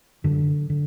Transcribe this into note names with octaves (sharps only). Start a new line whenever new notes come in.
F#2 D3
D3